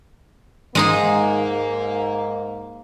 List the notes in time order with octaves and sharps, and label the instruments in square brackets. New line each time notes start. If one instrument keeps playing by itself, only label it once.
[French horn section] G#2 A#3 [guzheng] G#3 D#4 G#4